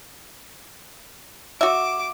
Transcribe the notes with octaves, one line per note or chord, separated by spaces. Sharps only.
F#4 E5 D6